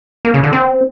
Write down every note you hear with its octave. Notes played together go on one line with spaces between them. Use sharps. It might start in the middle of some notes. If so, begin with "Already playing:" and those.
A#3
C#3
D3
C4